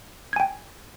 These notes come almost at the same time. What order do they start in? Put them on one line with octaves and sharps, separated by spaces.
G#6 G#5 G5